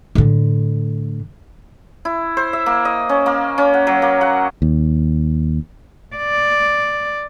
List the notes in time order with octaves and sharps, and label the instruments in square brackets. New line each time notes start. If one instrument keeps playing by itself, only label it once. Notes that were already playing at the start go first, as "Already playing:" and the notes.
[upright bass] A2 D3
[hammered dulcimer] E4
C5
E5
A#3
D#5
C#4
A#3
C#4
F#5
F#3
A#3
F#5
[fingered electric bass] D#2
[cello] D5